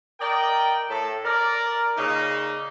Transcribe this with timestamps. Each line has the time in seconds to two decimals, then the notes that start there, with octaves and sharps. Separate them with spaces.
0.20 A#4 D5 D#5 G5
0.89 A2 A4
1.25 A#4 D5
1.97 A#2 C#3 A#3 D#4